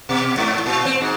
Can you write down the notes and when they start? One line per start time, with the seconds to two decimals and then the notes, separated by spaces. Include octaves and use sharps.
0.09 B2
0.37 G#2
0.66 A#2
0.85 C4
1.01 G#2